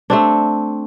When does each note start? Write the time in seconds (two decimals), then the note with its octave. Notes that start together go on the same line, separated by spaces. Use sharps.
0.10 A3 C4 D4